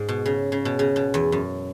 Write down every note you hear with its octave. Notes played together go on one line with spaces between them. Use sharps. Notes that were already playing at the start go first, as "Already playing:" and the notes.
Already playing: G#2
B2
C#3
C#3
B2
C#3
B2
E2
F#2